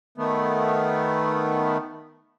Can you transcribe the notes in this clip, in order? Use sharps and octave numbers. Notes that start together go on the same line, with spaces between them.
D#3 A3 B3